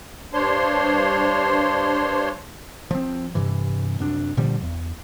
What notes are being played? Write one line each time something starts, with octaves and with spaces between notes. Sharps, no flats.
G2 D4 C5 C#5 C6
F3 C4
G2 C3 E3
C2 F#2 D4
A#2 D3 F3 G3
E2